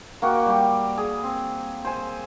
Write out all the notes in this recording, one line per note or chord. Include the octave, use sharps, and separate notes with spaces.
A#3 F#4 G5
G3 G4
G#4
C4
C5 G#5